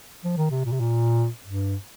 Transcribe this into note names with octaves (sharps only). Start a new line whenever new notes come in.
F3
D#3
C3
A#2
C3
A#2
G2